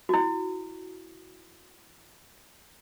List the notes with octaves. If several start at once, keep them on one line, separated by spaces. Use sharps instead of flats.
E4 F#4